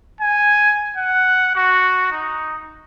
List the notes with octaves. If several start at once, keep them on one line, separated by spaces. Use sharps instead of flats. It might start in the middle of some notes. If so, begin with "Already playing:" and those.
G#5
F#5
F#4
D#4